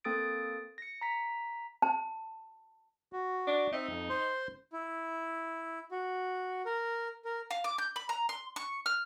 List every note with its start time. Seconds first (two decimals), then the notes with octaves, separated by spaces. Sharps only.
0.04 A#3 C4 A4 D#6 A6 D7
0.78 A#6 C#7
1.01 A#5 B6
1.82 A5
3.13 F#4
3.47 D4
3.72 C4 D#4 E5
3.89 F2
4.10 C5 C6
4.73 E4
5.91 F#4
6.66 A#4
7.25 A#4
7.51 F5
7.64 D6
7.78 G6
7.96 B5
8.09 A#5
8.29 C6
8.56 C#6
8.86 F6